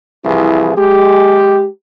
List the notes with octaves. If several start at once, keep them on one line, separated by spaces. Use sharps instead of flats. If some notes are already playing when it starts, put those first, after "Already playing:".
C2 E3 F3 E4 G#4
G#3 G4